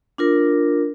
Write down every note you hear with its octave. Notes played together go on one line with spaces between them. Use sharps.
D4 F4 A#4